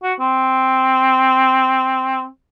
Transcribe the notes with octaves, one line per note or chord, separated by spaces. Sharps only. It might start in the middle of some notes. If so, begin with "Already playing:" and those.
F#4
C4